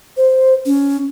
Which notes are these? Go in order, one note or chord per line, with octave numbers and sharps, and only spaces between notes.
C5
C#4